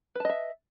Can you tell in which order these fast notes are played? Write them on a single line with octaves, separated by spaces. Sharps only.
B4 A5 D#5 E5